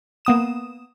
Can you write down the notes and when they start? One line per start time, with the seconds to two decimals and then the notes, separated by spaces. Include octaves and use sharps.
0.25 A#3 B3 D#6 E7